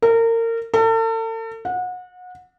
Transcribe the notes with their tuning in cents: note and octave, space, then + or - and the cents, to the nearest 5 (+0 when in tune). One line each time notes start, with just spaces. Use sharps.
A#4 -30
A4 +40
F#5 -30